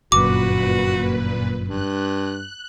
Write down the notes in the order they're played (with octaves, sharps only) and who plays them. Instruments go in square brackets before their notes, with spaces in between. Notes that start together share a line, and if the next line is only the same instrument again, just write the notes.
[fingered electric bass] G1 F#2 [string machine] A#2 B4 [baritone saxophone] F#4 [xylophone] D6
[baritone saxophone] G2 [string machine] F#6